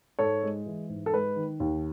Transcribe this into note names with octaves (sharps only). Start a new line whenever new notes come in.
G#2 A4 C#5
G#3
E3
G#2
A4
G#3 B4
D#3
D#2